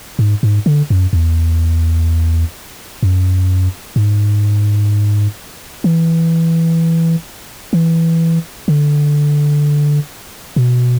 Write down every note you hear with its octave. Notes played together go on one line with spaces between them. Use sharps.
G#2
G#2
D3
F#2
E2
F#2
G#2
E3
E3
D3
B2